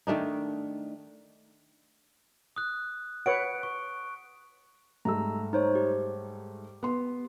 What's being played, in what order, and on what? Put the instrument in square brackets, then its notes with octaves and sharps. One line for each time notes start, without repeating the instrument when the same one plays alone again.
[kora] D#3 A3 D4 D#4
[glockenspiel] D#6 F#6
[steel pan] B4 C#5 F#5 [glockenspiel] D7
[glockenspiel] C#6
[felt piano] G#2 G3 A3 [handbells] A#5 E6
[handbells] D#4 C5 C#5
G4
[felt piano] B3 C6